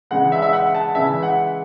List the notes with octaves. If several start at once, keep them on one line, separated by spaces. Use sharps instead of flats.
C#3 E3 G#3 F#5
E5
E5
F#5
A5
C#3 E3 G#3 E5
F#5